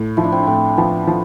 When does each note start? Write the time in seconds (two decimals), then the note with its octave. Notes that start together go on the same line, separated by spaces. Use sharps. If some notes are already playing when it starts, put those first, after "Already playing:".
Already playing: A2
0.17 F3 E4
0.24 D4
0.32 C4
0.39 D4
0.47 A2 C4
0.77 F3 B3
1.07 F3